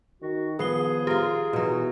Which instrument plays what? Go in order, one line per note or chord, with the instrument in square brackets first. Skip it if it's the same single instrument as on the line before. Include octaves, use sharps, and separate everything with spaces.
[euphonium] D#3 [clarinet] F#4
[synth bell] D#3 C7 G7 [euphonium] F3 [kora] B3 [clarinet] G#4
[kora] F4 A#4 [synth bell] G4
[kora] B2 F#3 [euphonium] E3